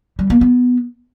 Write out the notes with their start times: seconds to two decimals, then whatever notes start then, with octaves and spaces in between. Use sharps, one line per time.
0.19 G3
0.30 A#3
0.41 B3